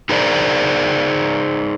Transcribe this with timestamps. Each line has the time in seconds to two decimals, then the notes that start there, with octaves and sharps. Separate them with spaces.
0.09 D#4 G#4 A#4 C5 D5